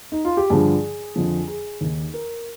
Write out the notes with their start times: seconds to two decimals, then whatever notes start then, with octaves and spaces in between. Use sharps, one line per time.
0.12 D#4
0.25 F4
0.37 G4
0.50 G2 D3 F3 G#4
1.16 F2 D3 F3
1.48 G#4
1.81 D#2 D#3
2.14 A#4